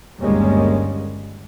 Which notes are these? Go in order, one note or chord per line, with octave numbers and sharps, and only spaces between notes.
G1 D#2 G3 G#3 A#3 C#4